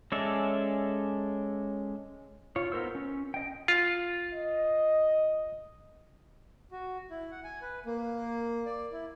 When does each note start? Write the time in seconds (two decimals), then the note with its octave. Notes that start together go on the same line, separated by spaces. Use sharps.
0.12 G#3 C#4 A4 D5 E5
2.56 F4 C#5
2.72 B3 D#4 A#4 C5 E6
2.95 C#4
3.34 D#5 G5
3.68 F4
4.34 D#5
6.72 F#4
7.10 E4
7.31 F#5
7.44 G#5
7.62 B4
7.86 A#3
8.66 D5
8.92 E4